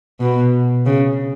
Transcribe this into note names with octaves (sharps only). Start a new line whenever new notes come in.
B2
C#3